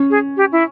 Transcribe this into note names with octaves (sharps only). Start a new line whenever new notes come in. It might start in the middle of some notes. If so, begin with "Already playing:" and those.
Already playing: C#4
G#4
G4
E4